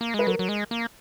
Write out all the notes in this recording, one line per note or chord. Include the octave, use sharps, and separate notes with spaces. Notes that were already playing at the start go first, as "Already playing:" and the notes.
A#3
G#3 B4
F#3 A#4
F#3
G#3
A#3